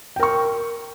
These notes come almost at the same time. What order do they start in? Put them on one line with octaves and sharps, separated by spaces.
G5 A#4 C#6